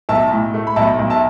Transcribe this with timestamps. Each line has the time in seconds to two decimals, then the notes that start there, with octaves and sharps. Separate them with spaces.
0.09 B1 E5 A5
0.31 A2
0.54 A3
0.67 B5
0.76 B1 E5 A5
0.99 B1
1.10 E5 A5